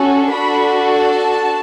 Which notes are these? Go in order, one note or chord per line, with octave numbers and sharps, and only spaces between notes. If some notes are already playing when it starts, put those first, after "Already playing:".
Already playing: C#4 F#4 A4
D4 F#4 A4 B5
A5